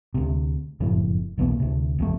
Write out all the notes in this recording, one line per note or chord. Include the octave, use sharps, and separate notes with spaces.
D2 C3
F#1 F2 A2
B1 E2 B2 A#3
D2 C3
F#1 F2 G#2 A3